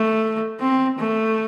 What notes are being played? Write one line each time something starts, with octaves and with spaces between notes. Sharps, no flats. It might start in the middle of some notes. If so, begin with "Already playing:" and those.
Already playing: A3
C4
A3